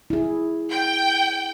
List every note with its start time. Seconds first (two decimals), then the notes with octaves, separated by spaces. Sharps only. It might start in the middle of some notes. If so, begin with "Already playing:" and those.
0.10 E4 G#4
0.70 G5